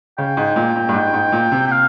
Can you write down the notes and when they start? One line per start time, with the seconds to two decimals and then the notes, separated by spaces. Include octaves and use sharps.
0.18 C#3 G5
0.37 G#2
0.56 A#2
0.76 A#2
0.89 G2
0.94 G#2
1.14 G#2
1.32 A#2
1.52 C3
1.67 G5
1.72 F5